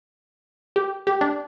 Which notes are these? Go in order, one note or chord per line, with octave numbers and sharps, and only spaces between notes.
G4
G4
D4